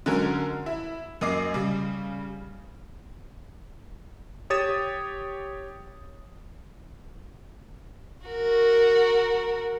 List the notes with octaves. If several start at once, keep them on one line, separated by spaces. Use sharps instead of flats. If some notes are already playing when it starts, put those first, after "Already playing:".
D3 F#3 G#3 C#4 A#4
E4
F#2 A#3 D#5 D6 C7
C#3 G3
G4 C#5 D#6 A6 E7
F#4 A#4